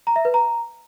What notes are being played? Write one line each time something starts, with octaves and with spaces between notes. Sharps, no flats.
A#5
E5
B4
A#5